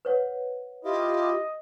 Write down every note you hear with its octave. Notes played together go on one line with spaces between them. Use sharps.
B4 C#5 F#5
E4 F4 G4 D#5